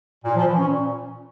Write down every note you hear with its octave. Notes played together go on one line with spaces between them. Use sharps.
A#2
F3
E3
C#4
A#2